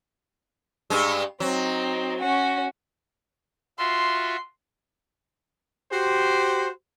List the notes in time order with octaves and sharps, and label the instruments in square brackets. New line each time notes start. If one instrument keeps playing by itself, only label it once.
[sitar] G2 G#3
[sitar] F#3 [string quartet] C4 D#4
[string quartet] C#4 F#4
[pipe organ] F4 F#4 E5 [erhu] C6
[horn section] F#4 G4 C5